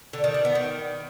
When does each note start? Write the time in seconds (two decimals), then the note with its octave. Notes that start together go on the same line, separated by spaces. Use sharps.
0.13 D3
0.24 D#3
0.34 D4
0.45 B3
0.55 D#3